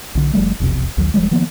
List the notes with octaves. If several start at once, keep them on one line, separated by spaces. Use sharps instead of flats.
B1 D3
F#1 F3 G3 A3
E1 B1 F2 C3
A#1 D#2 D#3 F#3
D#1 F3 G3 G#3
D#3 F3 A#3 B3